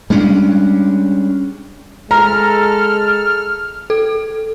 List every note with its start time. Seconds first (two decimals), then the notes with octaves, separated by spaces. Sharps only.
0.10 G3 G#3 C#4 D4
2.11 G#3 A4 A#5 F6
3.90 A4